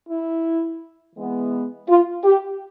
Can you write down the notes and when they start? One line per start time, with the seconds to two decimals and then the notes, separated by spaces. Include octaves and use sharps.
0.08 E4
1.16 E3 G#3 B3
1.88 F4
2.25 G4